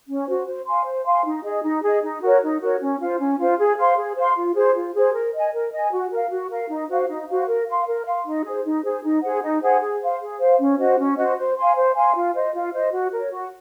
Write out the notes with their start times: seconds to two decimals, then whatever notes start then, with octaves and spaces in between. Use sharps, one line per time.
0.08 C#4
0.27 F#4 C5
0.46 C5
0.66 F5 G#5 C6
0.86 C5
1.05 F5 G#5 C6
1.25 D#4
1.44 G#4 D#5
1.64 D#4
1.82 G#4 D#5
2.03 D#4
2.21 F#4 A#4 C#5
2.42 D#4
2.61 F#4 A#4 C#5
2.80 C#4
3.00 F4 C5
3.19 C#4
3.39 F4 C5
3.58 G#4
3.78 C5 F5 C6
3.97 G#4
4.16 C5 F5 C6
4.35 F4
4.55 G#4 C5
4.76 F4
4.95 G#4 C5
5.14 A#4
5.34 D#5 G#5
5.53 A#4
5.72 D#5 G#5
5.91 F#4
6.11 A#4 F5
6.31 F#4
6.50 A#4 F5
6.69 D#4
6.89 F#4 C5 F5
7.08 D#4
7.28 F#4 C5 F5
7.48 A#4
7.67 F5 C6
7.86 A#4
8.05 F5 C6
8.26 D#4
8.44 G#4 C5
8.65 D#4
8.84 G#4 C5
9.03 D#4
9.22 G#4 C5 F#5
9.42 D#4
9.61 G#4 C5 F#5
9.81 G#4
10.01 C5 F5
10.21 G#4
10.40 C5 F5
10.59 C#4
10.79 F#4 C5 D#5
10.98 C#4
11.17 F#4 C5 D#5
11.37 C5
11.57 F5 G#5 C6
11.76 C5
11.95 F5 G#5 C6
12.14 F4
12.35 C5 D#5
12.54 F4
12.73 C5 D#5
12.92 F#4
13.12 A#4 C#5
13.31 F#4